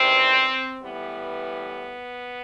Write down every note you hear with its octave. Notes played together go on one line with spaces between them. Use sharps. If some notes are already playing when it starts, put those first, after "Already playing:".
Already playing: E2 C3 D#3 G3 C4
A2 E3 G3 B3